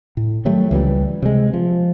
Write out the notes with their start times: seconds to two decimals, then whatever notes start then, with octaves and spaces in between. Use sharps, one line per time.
0.17 A2
0.45 D#3 F#3 G3 A3
0.71 C#2 E3 F3 G3
1.22 C3 G#3
1.54 F3